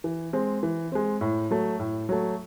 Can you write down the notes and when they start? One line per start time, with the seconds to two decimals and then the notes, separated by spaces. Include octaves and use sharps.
0.04 E3
0.33 G#3 C4
0.63 E3
0.92 G#3 C4
1.21 A2
1.51 F#3 A3
1.79 A2
2.09 F#3 A3